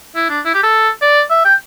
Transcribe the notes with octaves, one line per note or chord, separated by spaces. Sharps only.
E4
D4
E4
G4
A4
D5
E5
G5